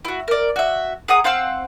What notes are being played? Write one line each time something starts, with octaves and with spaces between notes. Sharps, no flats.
E4 F#4
A#4 D5
F#4 E5
G#4 F#5 A#5 D#6
C4 F5 F#5 E6